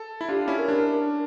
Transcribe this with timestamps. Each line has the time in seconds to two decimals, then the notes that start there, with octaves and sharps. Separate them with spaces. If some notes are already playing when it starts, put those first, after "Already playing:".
Already playing: A4
0.21 E4
0.28 D4 F4 G4
0.48 C#4 E4
0.58 A#4
0.68 D4